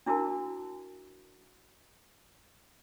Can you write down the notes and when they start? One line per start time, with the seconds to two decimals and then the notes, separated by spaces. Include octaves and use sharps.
0.06 D4 E4 F#4 A#4 A5